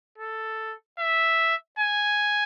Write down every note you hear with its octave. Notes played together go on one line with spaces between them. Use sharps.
A4
E5
G#5